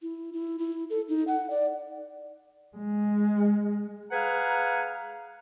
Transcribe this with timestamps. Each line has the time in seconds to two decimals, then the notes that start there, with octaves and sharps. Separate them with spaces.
0.02 E4
0.33 E4
0.59 E4
0.90 A4
1.09 D#4
1.27 F#5
1.50 D5
2.77 G#3
4.12 G#4 B4 F5 F#5 G#5 A#5